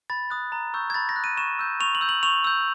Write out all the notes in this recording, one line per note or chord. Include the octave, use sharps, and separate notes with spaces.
B5 A6
D#6 F#6
A#5
C#6 E6 G6
G#6
B5 A6
A#6
D#6 F#6
D#7
C#6 E7
E6 G6
C#6 F7
F#7
E6 G6
F#7
C#6 F7
E6 G6